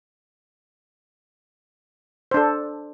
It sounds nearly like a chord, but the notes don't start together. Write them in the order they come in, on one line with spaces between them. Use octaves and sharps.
C5 D4 A4